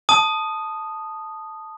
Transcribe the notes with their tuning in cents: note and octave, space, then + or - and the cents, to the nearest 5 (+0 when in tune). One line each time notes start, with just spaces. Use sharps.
A5 +0 D#6 -10